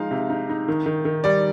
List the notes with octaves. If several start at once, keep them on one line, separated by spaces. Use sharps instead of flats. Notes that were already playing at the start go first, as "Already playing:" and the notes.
Already playing: F3 G#3 D#4 F5
C3
D#4
D#4
D#3
D#3
D#3
G3 D5